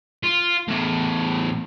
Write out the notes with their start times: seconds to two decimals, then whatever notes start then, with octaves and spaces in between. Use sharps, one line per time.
0.23 F4
0.68 E2 A2